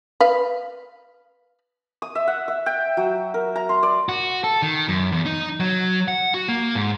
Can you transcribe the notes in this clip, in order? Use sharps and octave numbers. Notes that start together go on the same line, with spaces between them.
B4 F5
D#6
E5
F#5
E5
G5
F#3
A#4
A#5
C6
D5
F#4
A4
D#3
F#2
E2
D#4
F#3
F#5
F#4
A#3
G#2